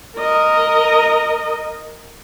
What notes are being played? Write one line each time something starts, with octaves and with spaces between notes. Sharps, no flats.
A#4 D#5